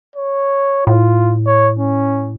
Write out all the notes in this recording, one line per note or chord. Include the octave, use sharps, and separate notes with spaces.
C#5
A2 F4
C#5
C#4